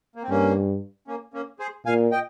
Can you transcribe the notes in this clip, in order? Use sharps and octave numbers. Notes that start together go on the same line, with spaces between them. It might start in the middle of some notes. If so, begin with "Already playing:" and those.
A#3
C4
G2 A#3 C#4
A#3 C#4
A#3 C#4
G#4 C5
A#2 F5 G#5
D#5 G5